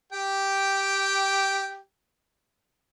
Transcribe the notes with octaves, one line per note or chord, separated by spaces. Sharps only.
G4 G5